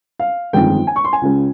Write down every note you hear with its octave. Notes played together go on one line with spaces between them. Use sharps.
F5
G1 F2 D#3 G#3 G5
G#5
C#6
C6
G#5
C#2 C#3 G#3